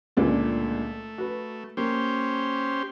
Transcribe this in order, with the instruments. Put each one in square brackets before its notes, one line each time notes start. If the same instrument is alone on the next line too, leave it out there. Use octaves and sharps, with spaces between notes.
[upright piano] C#2 A#2 D3 [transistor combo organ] A3
[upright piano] F#4 B4
[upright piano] A#3 [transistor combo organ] C#4 G4 C5